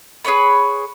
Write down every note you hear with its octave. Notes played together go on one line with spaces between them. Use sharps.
G#4 B4 C#5 B5